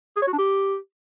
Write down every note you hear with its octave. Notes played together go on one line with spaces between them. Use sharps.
G#4
C#5
F#4
D4
G4